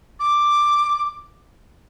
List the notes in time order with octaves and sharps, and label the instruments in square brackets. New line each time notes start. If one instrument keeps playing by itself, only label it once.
[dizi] D6